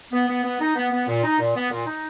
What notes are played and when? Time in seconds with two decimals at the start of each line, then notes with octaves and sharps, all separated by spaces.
0.12 B3
0.28 B3
0.44 B3
0.60 D#4
0.76 B3
0.92 B3
1.07 A#2
1.24 D#4
1.39 A#2
1.56 B3
1.71 A#2
1.87 D#4